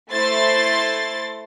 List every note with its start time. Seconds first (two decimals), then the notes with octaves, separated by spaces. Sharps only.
0.12 A3 E4 C5 C6 A6